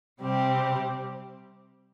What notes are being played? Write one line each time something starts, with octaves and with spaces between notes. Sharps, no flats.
C3 G3 C4 G4